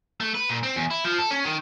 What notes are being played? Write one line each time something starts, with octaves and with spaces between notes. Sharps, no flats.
A3
B4
A#2
C4
E2
E4
F3
A4
C#4
D#3